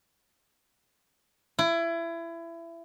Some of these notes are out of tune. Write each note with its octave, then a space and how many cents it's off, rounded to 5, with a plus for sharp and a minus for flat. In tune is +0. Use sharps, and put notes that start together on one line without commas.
E4 +25